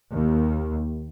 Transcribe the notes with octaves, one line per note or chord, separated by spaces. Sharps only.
D#2